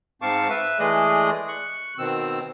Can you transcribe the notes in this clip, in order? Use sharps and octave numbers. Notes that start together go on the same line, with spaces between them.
G#2 C4 F5 A5 C#6 D6
B4 E5
E3 G#3 A3 G#4 D5 D#5
C#6 F#6
B2 D#3 C4 E6